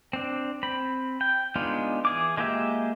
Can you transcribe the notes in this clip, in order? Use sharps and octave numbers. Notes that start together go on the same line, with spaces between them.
C4 D4
C4 B5
G5
G#3 B3 D4 D#4 F4
E3 G#4 D6
G#3 A#3 F4 G4 E5